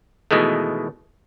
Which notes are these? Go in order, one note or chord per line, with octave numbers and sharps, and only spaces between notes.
B2 D#3 E3 G#3 A3